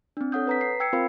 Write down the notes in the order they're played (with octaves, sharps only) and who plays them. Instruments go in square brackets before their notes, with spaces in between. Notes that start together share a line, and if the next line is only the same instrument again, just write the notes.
[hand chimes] C4 D4
A4 C#5 F#5 D#6 G6
B4 A#5 B6
C7
G5 E6 G#6 C7 C#7
C4 F4 A#4 C5 F5 B5